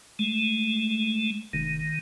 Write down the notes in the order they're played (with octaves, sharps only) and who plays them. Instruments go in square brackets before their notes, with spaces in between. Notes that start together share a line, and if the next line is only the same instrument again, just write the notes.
[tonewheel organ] G#3 A3
[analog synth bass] F1 [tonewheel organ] D#3